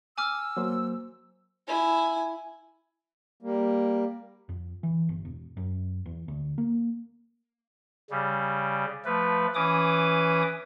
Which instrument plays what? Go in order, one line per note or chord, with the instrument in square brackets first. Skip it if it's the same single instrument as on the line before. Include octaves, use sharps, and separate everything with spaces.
[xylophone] G#5 D6 F6 [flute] E6
[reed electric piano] F#3 A#3 C5
[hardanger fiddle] E4 G#5
[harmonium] G3 A#3
[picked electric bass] F2
E3
G1
E1
F#2
E2
D2
A#3
[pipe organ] C#3 G3
F3 A3 B4
E3 C#4 B4 D6 D#6